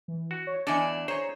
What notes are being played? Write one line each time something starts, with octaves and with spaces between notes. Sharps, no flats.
E3
F#4
C#5
E2 D4 A4 D#5 F#5 G#5
G#4 C5 C#5 A#5